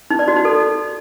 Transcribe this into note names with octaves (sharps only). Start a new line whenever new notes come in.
D#4
D5
F#4
D#4
A4